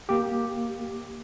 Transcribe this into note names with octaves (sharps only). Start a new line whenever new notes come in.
A#3 G4